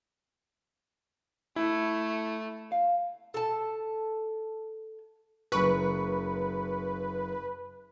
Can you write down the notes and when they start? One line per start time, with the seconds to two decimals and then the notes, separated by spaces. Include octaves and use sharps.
1.56 A3 E4
2.72 F5
3.34 A4 A5
5.52 F#1 B4 C#6